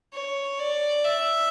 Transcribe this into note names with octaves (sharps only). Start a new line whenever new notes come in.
C#5
D5
E5